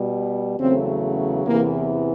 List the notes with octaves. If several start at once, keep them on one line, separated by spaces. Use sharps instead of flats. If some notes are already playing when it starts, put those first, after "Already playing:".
Already playing: B2 G3
E2 C#3 F#3 A3 C4
E2 C3 E3 A#3